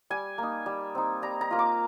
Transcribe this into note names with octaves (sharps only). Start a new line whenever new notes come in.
G3 G#5
A#3 D#4
G3
C4 D#4
G3 A#5
A#5
A#3 F4
D6